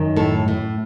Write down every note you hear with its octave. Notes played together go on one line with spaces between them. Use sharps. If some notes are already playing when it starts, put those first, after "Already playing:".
Already playing: F#2 D#3
A2 A4
A2